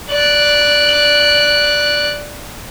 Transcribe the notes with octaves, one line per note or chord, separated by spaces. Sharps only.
D5 F#6